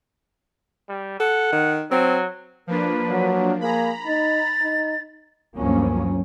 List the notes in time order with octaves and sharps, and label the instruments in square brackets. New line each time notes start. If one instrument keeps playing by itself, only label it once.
[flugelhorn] G3
[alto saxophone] A4 [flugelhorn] F#5
[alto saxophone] D#3
[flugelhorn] F#3 [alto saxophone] C4
[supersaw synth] F3 A#3 D4 [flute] B4
[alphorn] F#3
[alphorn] A#3 [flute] G#4 [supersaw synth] A#5 B5
[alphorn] D#4 [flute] A6
[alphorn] D#4
[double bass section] D2 G2 F3 F#3 A#3 C#4